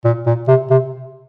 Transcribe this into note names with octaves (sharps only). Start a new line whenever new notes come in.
A#2
A#2
C3
C3